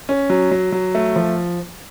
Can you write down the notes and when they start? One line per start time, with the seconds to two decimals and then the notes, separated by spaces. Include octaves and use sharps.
0.09 C#4
0.30 F#3
0.51 F#3
0.72 F#3
0.95 A3
1.16 F3